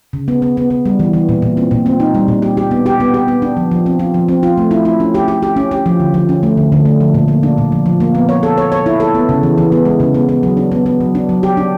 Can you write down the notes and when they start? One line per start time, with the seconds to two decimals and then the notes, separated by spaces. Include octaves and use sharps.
0.13 C#3
0.28 B3
0.42 B3
0.57 B3
0.70 B3
0.86 G3
1.00 E3
1.14 E3
1.29 A#2
1.42 A#2
1.57 C4
1.71 A#2
1.86 C4
2.00 D#4
2.15 G3
2.28 A#2
2.42 G4
2.57 G4
2.71 B3
2.86 G4
3.00 B3
3.14 G4
3.28 B3
3.42 D4
3.57 F3
3.72 F3
3.86 C4
3.99 F4
4.14 F3
4.28 C4
4.43 F4
4.58 A3
4.71 E4
4.85 E4
5.00 C#4
5.15 G4
5.28 G4
5.43 G4
5.56 C#4
5.71 G4
5.86 F3
6.00 D3
6.14 F3
6.29 C#4
6.43 A3
6.57 D3
6.72 D3
6.85 A3
7.00 F3
7.14 A#2
7.28 A#3
7.43 D4
7.58 A#2
7.72 F3
7.86 F3
8.00 A#3
8.15 B3
8.29 C#5
8.43 A4
8.58 C#5
8.72 C#5
8.86 E4
9.00 A4
9.15 B3
9.29 C#3
9.43 E3
9.58 E3
9.72 B3
9.85 G#3
10.00 C#3
10.14 B3
10.29 B3
10.43 F#3
10.57 D4
10.72 B3
10.86 B3
11.00 F#3
11.15 D4
11.29 F#3
11.43 G4
11.57 D4